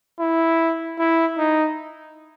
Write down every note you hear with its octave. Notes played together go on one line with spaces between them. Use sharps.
E4
E4
D#4